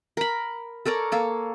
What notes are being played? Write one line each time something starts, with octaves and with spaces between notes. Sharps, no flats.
A#4 B5
A4 A#4 C#5 D5
A#3 A4 C#5